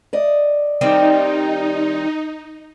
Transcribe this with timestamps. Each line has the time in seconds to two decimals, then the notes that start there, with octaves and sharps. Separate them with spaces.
0.13 D5 D#5
0.81 D#3 G3 C4 D#4